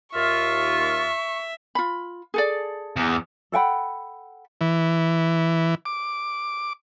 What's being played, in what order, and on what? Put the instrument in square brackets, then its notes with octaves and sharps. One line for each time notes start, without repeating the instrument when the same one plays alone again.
[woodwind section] D#2 F4 [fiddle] E5 [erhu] C#6
[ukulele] F4 B5
G#4 A4 D5
[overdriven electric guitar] E2
[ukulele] A4 F#5 G5 B5
[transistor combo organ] E3
D6